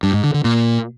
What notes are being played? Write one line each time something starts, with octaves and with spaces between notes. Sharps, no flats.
G2
G#2
D3
D3
A#2